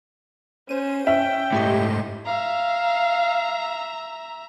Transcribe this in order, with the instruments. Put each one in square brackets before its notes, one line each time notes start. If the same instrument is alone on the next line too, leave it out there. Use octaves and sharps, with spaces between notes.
[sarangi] C#4 [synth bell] C5 D#7
[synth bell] C#4 [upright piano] E5 [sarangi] G5
[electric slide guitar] G#2 A3 [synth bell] E4 G4 D#5
[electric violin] E5 A#5 [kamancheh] F5